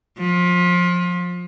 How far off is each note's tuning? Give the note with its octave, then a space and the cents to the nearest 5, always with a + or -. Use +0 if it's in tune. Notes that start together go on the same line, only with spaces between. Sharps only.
F3 +25